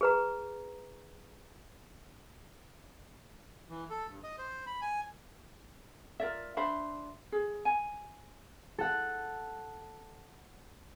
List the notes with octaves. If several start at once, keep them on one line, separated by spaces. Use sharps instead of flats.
G#4 B4 A#5
E3
A4
G2
D#5
C5
B5
G#5
F4 A#4 D5 E5
D4 C5 E5 B5
G#4
G#5
A4 F#5